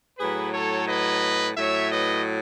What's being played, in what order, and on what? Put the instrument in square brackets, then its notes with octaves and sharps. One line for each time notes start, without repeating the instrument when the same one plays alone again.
[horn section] A2 F#3 G#4 B4
A4 C#5
B4 D#5
A2 F#3 C#5 E5
B4 D#5